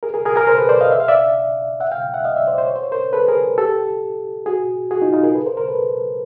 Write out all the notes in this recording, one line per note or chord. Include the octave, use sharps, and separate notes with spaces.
G#4 A#4
G#4 A#4
G#4 A#4
G#4 A#4
A#4 C5
A4 B4
C5 D5
D#5 F5
E5
F5
D5 E5
E5 F#5
F5 G5
E5 F#5
D#5 F5
D5 E5
C5 D5
C5
C#5
C5
C#5
A#4 C5
A4 B4
G#4 A#4
G4 A4
F#4 G#4
F#4 G#4
D#4 F4
D#4 F4
G#4 A#4
A4 B4
A#4 C5
A#4 C5
A4 B4